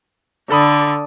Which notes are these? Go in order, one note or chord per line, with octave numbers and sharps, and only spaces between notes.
D3 A4 B5 D#6